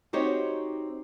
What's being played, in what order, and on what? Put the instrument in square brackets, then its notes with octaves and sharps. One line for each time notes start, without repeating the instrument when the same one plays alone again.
[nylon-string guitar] C4 D#4 F#4 G4 C5 C#5